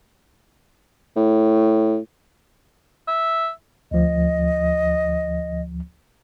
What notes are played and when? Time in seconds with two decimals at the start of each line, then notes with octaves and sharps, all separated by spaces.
1.16 A2
3.08 E5
3.91 D2 F3 D#5